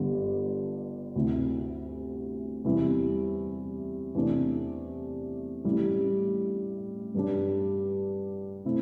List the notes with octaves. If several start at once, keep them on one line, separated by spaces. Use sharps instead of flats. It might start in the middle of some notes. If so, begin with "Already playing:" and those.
Already playing: G1 G2 D3 G3 D4
D2 C3 A3 E4
E2 C3 G3 E4
E2 C3 A3 D4
A1 A2 G3 E4
G2 G3 D4
C3 A3 C4 E4